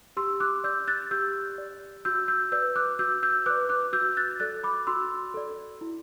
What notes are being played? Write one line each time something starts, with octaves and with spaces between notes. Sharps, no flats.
G4 C6 E6
D6 F#6
D5 E6 G6
F#6 A6
G4 E6 G6
D5
F#4 E6 G6
E6 G6
B4 D5 E6 G6
D6 F#6
F#4 E6 G6
E6 G6
B4 D5 D6 F#6
D6 F#6
F#4 E6 G6
F#6 A6
A4 D5 F#6 A6
B5 D6
F#4 C6 E6
A4 D5
E4